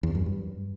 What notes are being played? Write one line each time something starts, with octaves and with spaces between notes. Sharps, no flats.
E2
F#2
G2